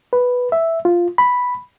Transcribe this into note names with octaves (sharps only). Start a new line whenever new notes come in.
B4
E5
F4
B5